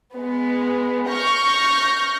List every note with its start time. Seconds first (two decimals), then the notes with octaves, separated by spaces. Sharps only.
0.14 G#3 B3
1.10 C#6 F6 G6 A#6